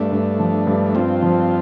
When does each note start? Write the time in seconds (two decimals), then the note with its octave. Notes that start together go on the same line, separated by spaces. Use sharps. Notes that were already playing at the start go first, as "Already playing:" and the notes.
Already playing: G2 A3 D4
0.11 G2
0.39 F3
0.67 G2
0.95 G2 C4 F4
1.22 F3